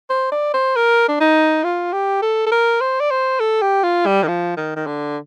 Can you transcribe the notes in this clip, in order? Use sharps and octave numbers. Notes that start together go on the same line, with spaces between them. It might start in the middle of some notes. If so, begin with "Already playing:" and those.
C5
D5
C5
A#4
D4
D#4
F4
G4
A4
A4
A#4
C5
D5
C5
A4
G4
F4
G3
D#3
F3
D#3
D#3
D3